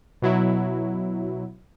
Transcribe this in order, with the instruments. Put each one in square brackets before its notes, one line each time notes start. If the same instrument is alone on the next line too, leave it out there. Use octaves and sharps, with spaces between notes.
[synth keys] B2 F#3 E4